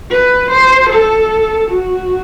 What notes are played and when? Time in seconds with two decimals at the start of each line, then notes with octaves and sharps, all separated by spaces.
0.10 B4
0.50 C5
0.90 A4
1.71 F#4